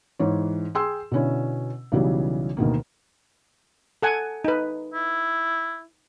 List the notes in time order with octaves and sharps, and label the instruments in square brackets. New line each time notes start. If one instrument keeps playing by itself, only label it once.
[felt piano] G#2 E3 C#5
G#4 G5 C6 E6
B2 D3 C#4 E4
B1 C#3 E3 F#3 G3
D2 B2 D#3 A#3
[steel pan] A4 F#5 G#5
D#4 B4
[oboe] E4